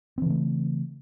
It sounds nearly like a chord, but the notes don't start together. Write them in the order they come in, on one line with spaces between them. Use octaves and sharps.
C4 E3 C#3 A3